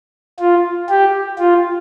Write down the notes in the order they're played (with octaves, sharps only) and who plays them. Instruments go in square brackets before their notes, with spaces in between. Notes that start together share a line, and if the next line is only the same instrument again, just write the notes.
[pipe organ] F4
G4
F4